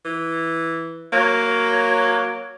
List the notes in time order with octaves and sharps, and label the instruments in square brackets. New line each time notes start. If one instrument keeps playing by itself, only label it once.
[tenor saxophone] E3
[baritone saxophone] F#3 [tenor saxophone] A#3